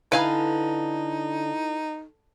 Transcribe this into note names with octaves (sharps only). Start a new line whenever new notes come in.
D3 D#4 E4 B4 F5 G#5